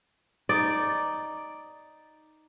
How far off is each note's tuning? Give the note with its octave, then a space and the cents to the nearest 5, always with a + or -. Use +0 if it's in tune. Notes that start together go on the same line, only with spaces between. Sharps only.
D#4 +0 D5 +0